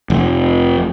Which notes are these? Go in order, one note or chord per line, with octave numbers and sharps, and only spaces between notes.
F1